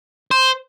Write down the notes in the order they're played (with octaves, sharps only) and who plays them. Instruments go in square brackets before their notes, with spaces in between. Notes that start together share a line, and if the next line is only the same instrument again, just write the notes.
[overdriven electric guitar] C5